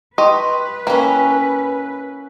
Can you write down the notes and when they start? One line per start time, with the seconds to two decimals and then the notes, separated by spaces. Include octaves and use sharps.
0.18 G4 B4 D#5 C6 C#6
0.87 A#3 C#4 E4 F5 G5